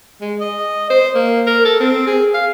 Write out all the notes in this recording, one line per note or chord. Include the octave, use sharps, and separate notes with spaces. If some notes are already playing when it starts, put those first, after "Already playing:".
G#3
D#5
C5
A#3
A#4
A4
C4
G#4
F5